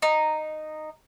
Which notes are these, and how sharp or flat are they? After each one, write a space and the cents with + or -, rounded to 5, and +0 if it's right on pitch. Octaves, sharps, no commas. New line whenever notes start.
D#4 -10